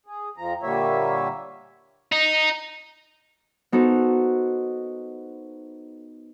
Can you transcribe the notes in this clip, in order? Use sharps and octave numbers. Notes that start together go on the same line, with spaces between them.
G#4
F2 F3 A#5
A#2 D3 G3 A#3 C#5 E5
D#4
B3 D#4 F#4 A4 C5